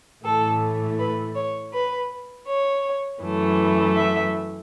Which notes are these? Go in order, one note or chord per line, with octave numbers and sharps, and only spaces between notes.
A2 E3 A3 A4
B4
C#5
B4
C#5
F#2 E3 A3
E5